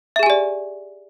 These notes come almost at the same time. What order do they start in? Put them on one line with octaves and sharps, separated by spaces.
E5 G#4 G#5 G4 D5